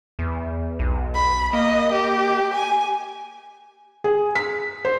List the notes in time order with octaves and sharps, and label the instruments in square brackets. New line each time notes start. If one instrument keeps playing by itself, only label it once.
[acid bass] E2
B1
[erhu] B5
[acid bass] A#3 [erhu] D#5
[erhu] G4
G#5
[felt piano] G#4
B6
C5